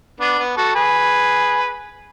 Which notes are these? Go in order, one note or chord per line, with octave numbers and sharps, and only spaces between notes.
B3 D4
B3
F#4 A4
G#4 B4